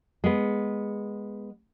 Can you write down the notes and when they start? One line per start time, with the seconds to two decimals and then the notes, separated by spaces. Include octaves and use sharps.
0.24 G#3 B3